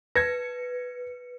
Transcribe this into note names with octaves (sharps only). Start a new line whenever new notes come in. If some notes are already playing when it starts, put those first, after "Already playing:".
B4 G#6 A#6 C#7